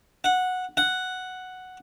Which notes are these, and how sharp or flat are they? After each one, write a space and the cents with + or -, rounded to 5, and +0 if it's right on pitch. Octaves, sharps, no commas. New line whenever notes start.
F#5 -10
F#5 +0